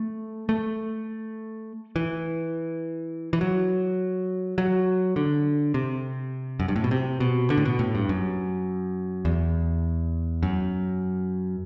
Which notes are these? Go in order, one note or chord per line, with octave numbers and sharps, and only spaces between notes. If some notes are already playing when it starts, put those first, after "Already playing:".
Already playing: A3
A3
E3
E3
F#3
F#3
D3
C3
F#2
G2
A2
B2
C3
B2
D3
A2
B2
A2
G2
F#2
E2
F#2